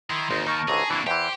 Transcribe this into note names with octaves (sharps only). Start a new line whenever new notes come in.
D#3 E4 C6
G#1 D#2 D#4
D#4 A#4 A5 C#6 G#6
G#1 C#2 D3 G#4 A#5
C3 E3 A#3 D4
E2 E3 G4 C5